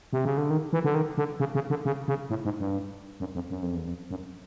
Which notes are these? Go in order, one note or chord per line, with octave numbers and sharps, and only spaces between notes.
C3
C#3
D3
D#3
E3
D3
D#3
D3
C#3
C#3
D3
C#3
C#3
A2
G#2
G2
F#2
F2
F#2
F2
E2
F2
F#2